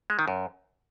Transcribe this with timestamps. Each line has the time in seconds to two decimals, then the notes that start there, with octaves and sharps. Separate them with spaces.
0.10 G#3
0.19 D#3
0.28 F#2